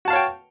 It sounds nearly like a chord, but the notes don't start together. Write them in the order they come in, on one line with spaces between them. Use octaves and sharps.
F#4 A5 F5 C#5 G5